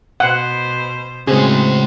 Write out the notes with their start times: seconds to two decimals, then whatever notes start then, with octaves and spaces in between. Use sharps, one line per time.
0.20 B2 C5 F#5
1.27 A2 C#3 G#3 C4 F#4 G#4